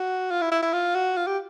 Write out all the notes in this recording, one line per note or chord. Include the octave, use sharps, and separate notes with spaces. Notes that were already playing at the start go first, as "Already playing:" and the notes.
Already playing: F#4
F4
E4
E4
E4
F4
F#4
F4
G4